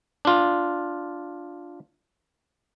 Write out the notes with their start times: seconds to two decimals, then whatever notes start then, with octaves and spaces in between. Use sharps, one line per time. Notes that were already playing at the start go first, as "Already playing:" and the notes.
0.25 D4 F4